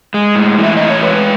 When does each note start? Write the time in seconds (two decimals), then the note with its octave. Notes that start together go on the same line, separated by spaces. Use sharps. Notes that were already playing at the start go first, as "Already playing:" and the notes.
0.14 G#3
0.35 A2
0.58 E3
0.63 E5
0.77 A2 D#5
0.90 C#5
1.01 G#3 B4